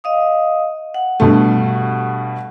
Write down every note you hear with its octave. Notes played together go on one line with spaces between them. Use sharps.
D#5 F5 D#6
F#5
G2 B2 A3